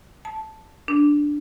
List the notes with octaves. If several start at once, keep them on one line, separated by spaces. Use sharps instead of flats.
A5
D4